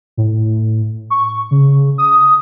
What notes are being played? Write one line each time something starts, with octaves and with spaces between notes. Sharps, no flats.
A2
C#6
C#3
D#6